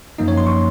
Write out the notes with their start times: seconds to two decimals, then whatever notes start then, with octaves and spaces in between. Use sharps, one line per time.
0.18 F#2 F3 A#3 D#4 D#5
0.28 C#5
0.37 C6
0.47 C#6